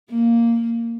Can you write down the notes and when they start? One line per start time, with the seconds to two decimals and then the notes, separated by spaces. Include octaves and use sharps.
0.10 A#3